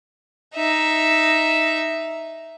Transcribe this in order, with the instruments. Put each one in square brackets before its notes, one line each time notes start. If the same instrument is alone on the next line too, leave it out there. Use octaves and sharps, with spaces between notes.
[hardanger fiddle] D#4 E5